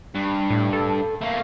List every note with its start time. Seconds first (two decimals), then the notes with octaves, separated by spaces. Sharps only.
0.15 G2
0.50 A2
0.73 A4
1.21 A3 A#3